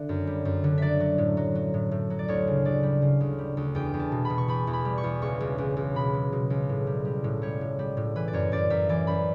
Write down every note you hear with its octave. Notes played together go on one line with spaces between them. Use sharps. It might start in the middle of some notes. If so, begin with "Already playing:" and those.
Already playing: D3 E5
F#2
G3
F#2
D3
F#3 D5 E5
F#3
A2
F#3
F#3
A2
A2
F#3
D5
D2 C#5
C#3
D2 D5
G3
C#3
D2
G3
D2
E2 G5
E2
A5
B2
B2 B5
C#6
E2 B5
E2
B5
G3
C#6
E2
C#2 C#6
C#2
C#2
C#2
B2 B5
F#3
B2
C#2
A2
G3
G3
A2
G3 C#5
A2
G3
A2
E3 B4
D5
F#2 C#5
F#2 D5
F#2 E5
E3 D5
F#2 B5